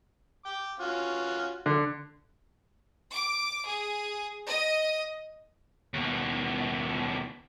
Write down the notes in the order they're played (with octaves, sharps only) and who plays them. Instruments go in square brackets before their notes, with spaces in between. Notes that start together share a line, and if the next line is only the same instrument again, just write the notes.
[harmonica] G5 D6
C#4 F4 F#4
[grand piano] D3
[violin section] D6
G#4
D#5
[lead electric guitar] D#2 B2